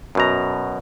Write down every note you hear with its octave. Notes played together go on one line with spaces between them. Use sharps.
F#2 B2 A#5